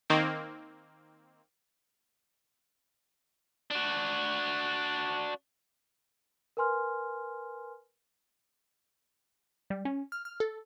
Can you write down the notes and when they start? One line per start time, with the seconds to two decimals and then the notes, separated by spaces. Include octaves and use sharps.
0.10 D#3 A#3 C4
3.71 D4 F#4
6.57 A#4 B4 G#5 C6 F6
9.70 G3
9.85 C#4
10.12 F6
10.25 F6
10.40 A4